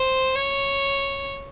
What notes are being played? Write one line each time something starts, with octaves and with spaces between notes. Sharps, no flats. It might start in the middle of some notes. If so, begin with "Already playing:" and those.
Already playing: C5
C#5